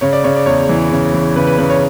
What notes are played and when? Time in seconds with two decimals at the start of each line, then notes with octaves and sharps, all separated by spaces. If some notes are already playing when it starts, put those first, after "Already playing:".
0.01 C#3 C#5
0.13 D5
0.24 C#3 C#5
0.36 D5
0.46 E2 C#5
0.69 E3
0.92 C#3
1.14 E3
1.36 C#3 B4
1.47 B4
1.58 C#3 B4
1.70 C#5